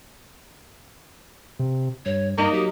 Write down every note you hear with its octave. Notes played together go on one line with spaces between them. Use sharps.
C3
G2 C#5
G2 A#3 D#4 D#5
F#3 G4